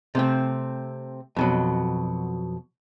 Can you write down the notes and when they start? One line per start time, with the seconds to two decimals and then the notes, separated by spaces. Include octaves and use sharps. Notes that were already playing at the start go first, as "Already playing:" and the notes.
0.15 C3 A3 C4
1.36 F2 B2 F#3